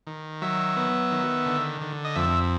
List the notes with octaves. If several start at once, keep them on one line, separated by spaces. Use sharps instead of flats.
D#3
F#3 E5
B3
D#3
D3
D3
D#5
F2 E5